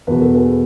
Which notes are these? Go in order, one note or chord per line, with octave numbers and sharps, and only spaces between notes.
E2 B2 B4
A4
G#4 B4